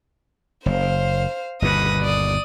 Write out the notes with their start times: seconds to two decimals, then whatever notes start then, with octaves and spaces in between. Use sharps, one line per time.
0.66 F#1 C5 F5
1.62 G1 D#2 B2 B4 D#6 A#6
2.03 D5 D#6